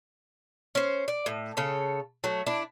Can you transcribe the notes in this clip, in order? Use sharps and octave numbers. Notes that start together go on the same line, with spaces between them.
C#4 C5
D5
A2
C#3 A4 C#5
F#3 A3
D4 E4